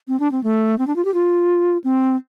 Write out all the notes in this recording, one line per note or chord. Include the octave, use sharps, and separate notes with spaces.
C4
D4
C4
A3
C4
D4
F4
G4
F4
C4